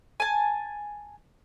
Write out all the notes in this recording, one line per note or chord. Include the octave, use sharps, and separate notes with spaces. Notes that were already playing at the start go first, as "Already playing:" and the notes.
G#5 A5